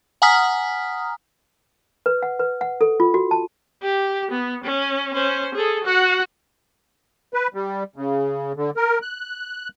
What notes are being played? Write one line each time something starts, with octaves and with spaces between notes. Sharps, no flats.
F#5 G#5 A#5 D#6 F6 B6
B4
F#5
B4
F#5
A4
F4
F#4
A5
G4
B3
C#4
C#4 C5
G#4 A4
F#4 F#5
B4
G3
C#3
D3
A#4
F#6